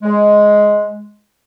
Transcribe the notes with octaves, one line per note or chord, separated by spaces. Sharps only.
G#3